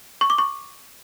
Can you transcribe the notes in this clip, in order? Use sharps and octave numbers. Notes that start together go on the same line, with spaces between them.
C#6
D6
C#6